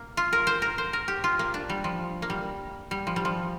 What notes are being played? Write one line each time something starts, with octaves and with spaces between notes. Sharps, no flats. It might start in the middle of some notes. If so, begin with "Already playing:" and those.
Already playing: A#3
F4
A#4
C5
A#4
C5
A#4
G4
F4
A#3
D4
G3
F3
A#3
G3
G3
F3
G3
F3